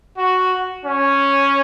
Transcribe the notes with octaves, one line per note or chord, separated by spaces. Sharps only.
F#4
C#4